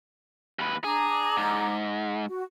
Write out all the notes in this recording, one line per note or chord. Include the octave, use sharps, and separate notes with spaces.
D#2 B4
D4 G#4 A#5 D6
G#2
F#4